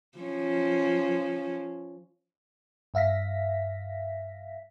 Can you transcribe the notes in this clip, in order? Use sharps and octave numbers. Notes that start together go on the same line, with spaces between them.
F3 C#4
G2 E5 F5 A#6 B6